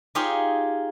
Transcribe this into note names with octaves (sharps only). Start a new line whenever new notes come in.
D#4 F4 G4 G#4 C#5